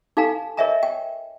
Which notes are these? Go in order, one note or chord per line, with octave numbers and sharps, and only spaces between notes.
D#4 A4 F5 G#5 A#5
A#4 C#5 D#5 E5 G#5 A#5
G5